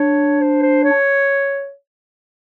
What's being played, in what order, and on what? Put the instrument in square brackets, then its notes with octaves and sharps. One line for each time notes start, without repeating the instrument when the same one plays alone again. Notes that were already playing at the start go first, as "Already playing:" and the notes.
Already playing: [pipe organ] D4 [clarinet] C#5
[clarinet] C5
C5
C#5